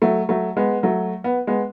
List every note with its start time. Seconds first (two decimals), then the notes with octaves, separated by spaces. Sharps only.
0.02 F#3 A3
0.29 F#3 A3
0.57 G#3 B3
0.83 F#3 A3
1.24 B3
1.47 G#3 B3